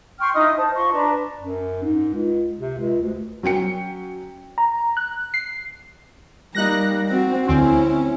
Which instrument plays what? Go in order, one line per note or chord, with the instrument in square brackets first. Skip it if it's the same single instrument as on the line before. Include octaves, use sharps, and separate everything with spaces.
[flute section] G5 C6 C#6 F6
D#4 E4 D#5 D#6
C5 A5
F4 D#5 C6 C#6
D4 B4 A5 A#5
[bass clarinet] F#2
G#2
C#2
C3
C#2
D2
[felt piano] F#3 C#4 G5 C#7
[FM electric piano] A#5
F#6
C7
[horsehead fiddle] G3 A#3 [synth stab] D#4 F#6 A#6
[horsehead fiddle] C4 F#4
[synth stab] D2 C4 [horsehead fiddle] C#4 E4